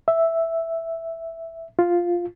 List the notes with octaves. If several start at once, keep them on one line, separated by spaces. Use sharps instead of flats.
E5
F4